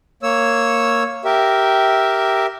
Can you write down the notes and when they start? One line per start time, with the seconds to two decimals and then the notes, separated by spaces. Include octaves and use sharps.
0.23 A#3 C#5 E6
1.25 G4 A#4 E5